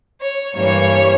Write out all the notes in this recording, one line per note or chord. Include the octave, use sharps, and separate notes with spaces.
C#5
G2 E3 G3 A#3 C#5